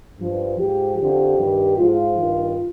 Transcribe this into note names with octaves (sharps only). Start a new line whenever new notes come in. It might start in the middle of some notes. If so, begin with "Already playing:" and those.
G2 F3
G#2 F3 G4
F2 D3 F3 G4
G2 D#3
G#2 F3 F4
G2 D#3